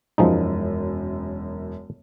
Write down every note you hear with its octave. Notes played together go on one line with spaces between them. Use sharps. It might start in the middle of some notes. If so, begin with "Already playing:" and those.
E1 F#2 F3 G#3 D#4